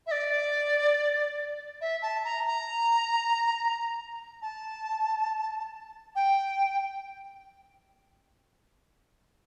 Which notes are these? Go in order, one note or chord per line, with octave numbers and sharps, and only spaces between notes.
E5
D5
E5
A5
A#5
A#5
A5
G5